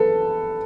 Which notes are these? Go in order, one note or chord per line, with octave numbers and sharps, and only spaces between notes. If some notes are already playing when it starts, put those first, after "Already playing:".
Already playing: A4 B4